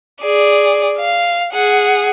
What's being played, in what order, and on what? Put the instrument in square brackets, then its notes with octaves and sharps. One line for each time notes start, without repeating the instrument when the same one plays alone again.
[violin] G#4 D5
F5
G#4 F#5